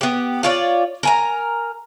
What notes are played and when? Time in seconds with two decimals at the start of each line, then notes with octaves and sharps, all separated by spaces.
0.01 B3 G4
0.43 F4 C#5 D5
1.03 A#4 G#5 A#5